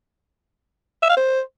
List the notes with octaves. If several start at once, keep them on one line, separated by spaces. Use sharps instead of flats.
E5
F5
C5